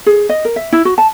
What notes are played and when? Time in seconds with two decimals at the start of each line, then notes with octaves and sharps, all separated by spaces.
0.06 G#4
0.29 D#5
0.45 A#4
0.56 E5
0.73 E4
0.85 F#4
0.98 A5